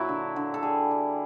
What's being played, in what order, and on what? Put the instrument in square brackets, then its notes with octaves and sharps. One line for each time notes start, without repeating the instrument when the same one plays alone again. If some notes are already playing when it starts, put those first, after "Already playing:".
Already playing: [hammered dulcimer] A#2 F#3 E4
D3
D3
A4
G3 G#4
G3